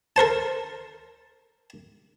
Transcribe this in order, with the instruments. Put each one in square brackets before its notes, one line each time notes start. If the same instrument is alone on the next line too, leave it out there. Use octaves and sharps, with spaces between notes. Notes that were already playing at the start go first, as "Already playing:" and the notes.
[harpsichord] A4 A#4 C5 A5